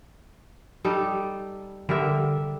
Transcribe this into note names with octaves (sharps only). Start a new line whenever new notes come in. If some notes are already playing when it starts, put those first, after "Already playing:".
G3 D#4 A4
D3 G3 A#4 E5